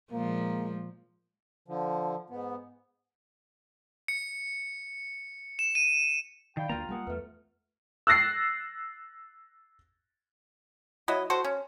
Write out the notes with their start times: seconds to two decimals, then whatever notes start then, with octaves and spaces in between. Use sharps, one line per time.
0.12 A#2 F3 G#3 A#3
1.68 D3 F3
2.30 G#2 B3
4.08 C#7
5.59 E7
5.75 D#7
6.57 D#3 D5 F5 G5 B5
6.69 D2 F3 A#3 F4 A#5 A6 D#7
6.89 G3 A3 A#3 F#5 G#5 A5 D#6
7.07 E2 A3 B4 E5 F6
8.07 E6 F#6 A6 A#6 C7
11.08 F#3 E4 D#5
11.30 F#4 A4 C5
11.44 C#4